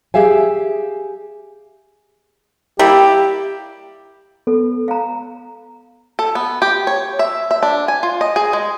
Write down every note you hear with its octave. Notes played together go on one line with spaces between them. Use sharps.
G4 G#4 E5 F5 G#5
G3 A#3 E4 G4
B3 A4
F5 A#5
A4
B3
G4
C#5
E5
E5
D4
G#5
F4
D#5
G#4
G#3